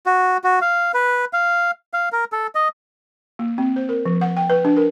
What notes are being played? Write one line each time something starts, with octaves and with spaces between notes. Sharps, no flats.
F#4
F#4
F5
B4
F5
F5
A#4
A4
D#5
A#3
C4
C5
A#4
F3
F#5
G5
B4
D4
A#4